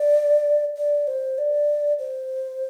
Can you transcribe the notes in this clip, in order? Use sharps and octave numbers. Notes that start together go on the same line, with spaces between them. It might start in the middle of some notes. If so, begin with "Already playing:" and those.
Already playing: D5
D5
C5
D5
C5